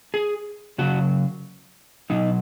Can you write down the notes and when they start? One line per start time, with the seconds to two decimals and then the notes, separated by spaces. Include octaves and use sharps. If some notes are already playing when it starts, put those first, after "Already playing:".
0.14 G#4
0.78 C#3 F#3 F#4
2.10 B2 F#3 D#4